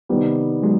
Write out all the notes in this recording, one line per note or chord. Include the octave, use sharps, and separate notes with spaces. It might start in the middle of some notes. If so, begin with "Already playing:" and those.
C3 D#3 G3 B3
F#3 G#3